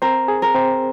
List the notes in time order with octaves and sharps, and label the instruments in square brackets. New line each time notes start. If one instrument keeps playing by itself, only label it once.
[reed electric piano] C4 C5 [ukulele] A#4
[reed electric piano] G#4
[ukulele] A#4
[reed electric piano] C4 C5